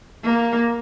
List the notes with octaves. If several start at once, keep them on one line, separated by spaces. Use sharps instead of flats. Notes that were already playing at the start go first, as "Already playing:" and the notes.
A#3